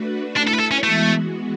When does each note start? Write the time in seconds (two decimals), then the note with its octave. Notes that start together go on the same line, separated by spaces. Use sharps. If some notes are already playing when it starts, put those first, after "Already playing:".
Already playing: A3 D4 F#4 B4
0.36 A3 D4 E4 B4
0.48 A4
0.55 B4
0.60 A4
0.71 C#4
0.83 E3 G#3 A3 B3 F#4